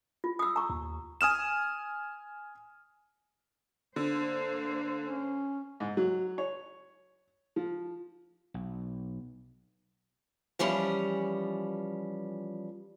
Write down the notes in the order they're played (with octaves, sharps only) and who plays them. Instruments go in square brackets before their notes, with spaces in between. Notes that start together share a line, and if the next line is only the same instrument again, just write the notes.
[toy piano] F4
D#6 E6
A#5 C#6
[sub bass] D#2
[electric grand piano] G#5 D#6 F6 E7
[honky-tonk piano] D3 [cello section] A#3 C5
[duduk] C#4
[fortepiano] G#2
F#3
C#5
F3
[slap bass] B1
[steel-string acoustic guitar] E3 F3 G3 C#4